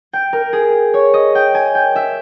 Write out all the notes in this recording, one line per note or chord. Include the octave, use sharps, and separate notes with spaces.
G5
A#4
G#4
C#5
D#5
G5
G#5
G5
E5